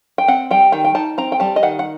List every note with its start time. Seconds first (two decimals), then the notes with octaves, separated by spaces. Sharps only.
0.18 G5
0.28 C4 F#5
0.51 G3 G5
0.72 D#3 G5
0.84 G5
0.95 D#4 A5
1.18 C4 A#5
1.32 G5
1.40 G3 A5
1.56 D#5
1.63 D#3 F#5
1.79 F#5